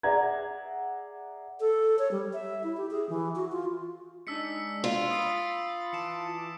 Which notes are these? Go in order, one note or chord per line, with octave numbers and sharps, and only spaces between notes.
G#4 D5 E5 F#5 A#5 G#6
A4
C#5
G3
E5
E4
G4
G#4
E3
F#4
F4
G#3 D4 D#4 E6 B6 C#7
F4
B5 D#6 A6 C7
E3 A5 D6 C#7 E7